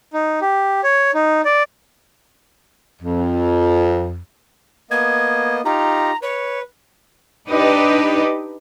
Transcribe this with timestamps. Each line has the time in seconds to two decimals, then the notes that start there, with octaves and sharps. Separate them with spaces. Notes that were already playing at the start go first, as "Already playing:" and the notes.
0.13 D#4
0.41 G4
0.84 C#5
1.14 D#4
1.45 D5
3.02 F2
4.91 A#3 B3 D#5 G#6
5.65 D#4 F4 G4 A#5
6.22 B4 C#5
7.48 D4 D#4 G4 B4 D5 D#5